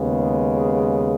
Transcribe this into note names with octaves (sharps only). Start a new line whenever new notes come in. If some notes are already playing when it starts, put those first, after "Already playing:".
Already playing: D#2 C#3 G#3 B3